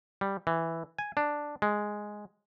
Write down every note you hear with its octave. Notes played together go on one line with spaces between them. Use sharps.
G3
E3
G#5
D4
G#3